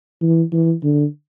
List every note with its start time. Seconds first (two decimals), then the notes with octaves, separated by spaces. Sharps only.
0.21 E3
0.52 E3
0.83 D3